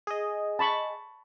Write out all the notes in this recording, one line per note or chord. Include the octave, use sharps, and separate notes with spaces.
G#4 D#5
A5 B5 C#6